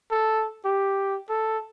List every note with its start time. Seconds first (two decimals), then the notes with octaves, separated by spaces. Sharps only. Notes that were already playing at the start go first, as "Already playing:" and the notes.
0.11 A4
0.65 G4
1.29 A4